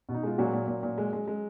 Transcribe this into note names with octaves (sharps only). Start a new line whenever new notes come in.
B2
D#4
G#3 F4
A#2 F#3 F#4
A#2
A#2
A#2
G#3
G#3
G#3